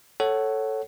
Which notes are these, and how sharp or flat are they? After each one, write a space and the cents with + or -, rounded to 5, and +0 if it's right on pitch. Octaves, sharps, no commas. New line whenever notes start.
A4 +0 C#5 -5 F#5 +20